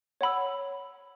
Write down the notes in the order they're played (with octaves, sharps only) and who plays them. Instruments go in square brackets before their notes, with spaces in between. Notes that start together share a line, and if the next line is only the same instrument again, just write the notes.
[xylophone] C#5 F#5 B5 E6